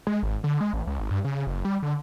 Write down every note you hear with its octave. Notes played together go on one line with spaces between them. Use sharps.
G#3
G#1
D3
G#3
A1
C#2
G#1
G2
C#3
F#1
G3
D3